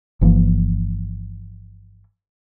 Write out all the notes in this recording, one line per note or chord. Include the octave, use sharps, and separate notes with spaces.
G1 E3 F3 A#3